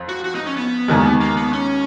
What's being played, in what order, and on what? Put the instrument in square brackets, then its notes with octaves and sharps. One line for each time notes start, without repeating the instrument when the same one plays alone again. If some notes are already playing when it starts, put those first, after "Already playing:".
Already playing: [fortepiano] F2
[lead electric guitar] F#4
F#4
D#4
C#4
B3
[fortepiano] D#2 D#3 G#3
[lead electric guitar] A#3
B3
C#4